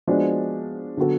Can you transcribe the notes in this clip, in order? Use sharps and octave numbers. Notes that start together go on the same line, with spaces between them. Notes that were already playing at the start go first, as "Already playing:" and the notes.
F3 G#3 B3 D4 F#4
D3 F#3 B3 F#4 A4